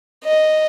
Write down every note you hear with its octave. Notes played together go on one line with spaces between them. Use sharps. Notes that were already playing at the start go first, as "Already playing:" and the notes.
D#5